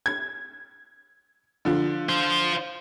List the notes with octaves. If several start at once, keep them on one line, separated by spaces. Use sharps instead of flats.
G#6
D3 F3
F4 C5